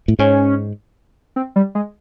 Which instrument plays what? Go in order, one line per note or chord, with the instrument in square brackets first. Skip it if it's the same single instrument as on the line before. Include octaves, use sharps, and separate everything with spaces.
[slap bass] A2
[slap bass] G#2 [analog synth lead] C#4
[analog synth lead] C4
G3
G#3